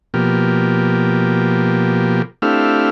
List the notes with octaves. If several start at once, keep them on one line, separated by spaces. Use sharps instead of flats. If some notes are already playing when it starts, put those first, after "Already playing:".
B2 F3 A#3 G4
A3 C4 D4 E4 G4 F5